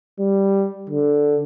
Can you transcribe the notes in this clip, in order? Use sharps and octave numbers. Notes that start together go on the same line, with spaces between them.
G3
D3